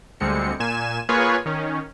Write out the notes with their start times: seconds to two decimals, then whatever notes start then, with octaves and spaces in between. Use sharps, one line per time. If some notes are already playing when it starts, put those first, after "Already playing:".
0.20 D2 D3 G3 G#3 C4 C#7
0.60 A#2 G#5 E7
1.09 A#3 F4 G#4 B4 C#5 G#5
1.46 D#3 C#4